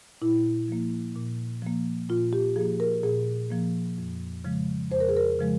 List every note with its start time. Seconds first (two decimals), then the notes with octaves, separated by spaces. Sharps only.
0.22 A#2 E4
0.68 F3 A#3
1.16 A#2
1.62 F3 A#3
2.09 A#2 F4
2.33 G4
2.56 F3 A#3 G#4
2.80 A#4
3.03 A#2 G#4
3.51 F3 A#3
3.98 F2
4.45 C#3 F3 G#3
4.91 F2 C5
5.00 A#4
5.09 G#4
5.17 A#4
5.39 C#3 F3 G#3